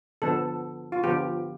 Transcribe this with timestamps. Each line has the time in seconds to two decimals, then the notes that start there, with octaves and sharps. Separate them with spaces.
0.22 D3 F3 B3 A4
0.92 F4
1.03 D3 F3 B3 G4